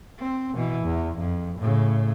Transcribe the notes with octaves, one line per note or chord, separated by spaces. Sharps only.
C4
B2 E3
E2
F2
A2 C#3